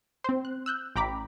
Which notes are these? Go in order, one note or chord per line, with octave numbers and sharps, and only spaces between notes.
C4 C5
F#6
E6 F#6 G6
A1 G5 A#5 B5 D6 B6